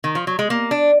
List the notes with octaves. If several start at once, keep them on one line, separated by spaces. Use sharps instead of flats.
D#3
F3
F#3
G#3
A#3
D4